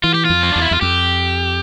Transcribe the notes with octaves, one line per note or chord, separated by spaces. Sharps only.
E3 F4
G4
F2 F4
C4
E2 D4
E4
E2 F4
F2 G4